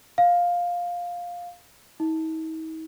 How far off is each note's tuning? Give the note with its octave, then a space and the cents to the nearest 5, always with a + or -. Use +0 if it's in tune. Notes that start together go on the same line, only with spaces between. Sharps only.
F5 +10
D#4 +45